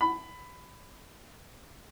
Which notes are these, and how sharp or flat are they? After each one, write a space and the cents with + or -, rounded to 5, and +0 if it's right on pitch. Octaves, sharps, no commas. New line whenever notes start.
B5 +15